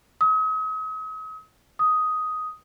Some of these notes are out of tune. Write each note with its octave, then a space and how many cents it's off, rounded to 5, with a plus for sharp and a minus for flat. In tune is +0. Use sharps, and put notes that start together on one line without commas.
D#6 +40
D#6 +5